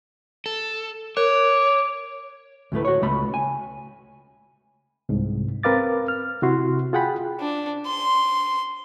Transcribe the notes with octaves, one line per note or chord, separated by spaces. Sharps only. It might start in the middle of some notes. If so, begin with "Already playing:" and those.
A4
A#4 C#5 D6
D2 A2 A3 B4
F#4 C#5
C#2 A3 B5
G#5
C2 G#2
C4 A#4 B4 F5 D6 A6
F6
C3 E4 F#4 C6
F4 G#4 F#5 G5 B5
D4
C6